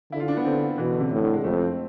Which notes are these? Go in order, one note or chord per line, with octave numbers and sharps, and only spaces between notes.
D3 E4
F4
D4
B3
D3 C4
B2 E3
D3
C3
A2
D3
G#3
F2 A3
C4